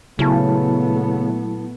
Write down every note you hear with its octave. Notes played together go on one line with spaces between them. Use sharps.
A#2 C#3 F#3 A3 B3 E4 A5